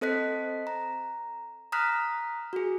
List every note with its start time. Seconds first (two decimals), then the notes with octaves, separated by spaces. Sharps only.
0.01 C4 A4 C5 D#5 F#6 B6
0.67 A#5
1.72 A#5 D#6 F6 F#6 B6
2.53 F#4 G#4